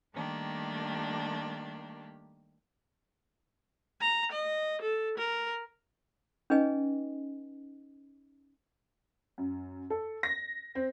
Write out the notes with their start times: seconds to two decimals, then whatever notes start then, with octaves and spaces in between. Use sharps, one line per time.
0.15 D#3 G3 A3 A#3 D4 G4
4.01 A#5
4.32 D#5
4.82 A4
5.18 A#4
6.50 C#4 D#4 G#4 B4 D#5 G#5
9.38 F#2
9.90 A4
10.23 A#6
10.75 C4